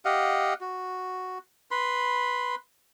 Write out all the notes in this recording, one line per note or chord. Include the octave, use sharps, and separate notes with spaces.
G4 D#5 F5 F#5
F#4
B4 B5 C6